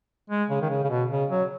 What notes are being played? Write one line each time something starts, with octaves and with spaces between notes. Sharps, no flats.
G#3
C#3
D#3
C#3
C#3
B2
C#3
F#3